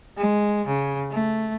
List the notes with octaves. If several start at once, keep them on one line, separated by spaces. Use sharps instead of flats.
G#3
C#3
A3